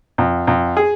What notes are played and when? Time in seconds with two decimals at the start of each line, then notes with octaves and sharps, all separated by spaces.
0.18 F2
0.47 F2
0.77 G#4